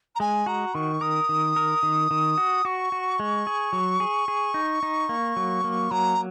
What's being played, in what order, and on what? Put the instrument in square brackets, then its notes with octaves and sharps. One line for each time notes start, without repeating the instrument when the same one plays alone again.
[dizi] A#5
[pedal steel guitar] G#3 [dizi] G#5
[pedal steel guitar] F#4 [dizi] A#5
[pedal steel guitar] D#3 [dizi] C#6
[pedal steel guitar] A#4 [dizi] D#6
[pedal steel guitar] D#3
A#4
D#3
D#3
F#4
[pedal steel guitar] F#4 [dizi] C#6
[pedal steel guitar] F#4
G#3
G#4
F#3
G#4
G#4
D#4
D#4
A#3
F#3
A#3
[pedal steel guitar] F#3 [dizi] A#5